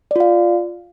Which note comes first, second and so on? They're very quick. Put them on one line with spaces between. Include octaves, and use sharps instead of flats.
D5 F4 F5